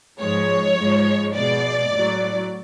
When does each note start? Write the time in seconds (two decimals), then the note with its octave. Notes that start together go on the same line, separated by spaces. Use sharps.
0.20 G#2 F3 G#3 C#5
0.78 G#2 F3 G#3
1.35 B2 G#3 D5
1.93 A2 F#3